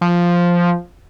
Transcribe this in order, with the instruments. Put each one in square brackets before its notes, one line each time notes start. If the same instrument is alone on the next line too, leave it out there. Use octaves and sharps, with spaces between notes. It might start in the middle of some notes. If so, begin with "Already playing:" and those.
[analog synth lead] F3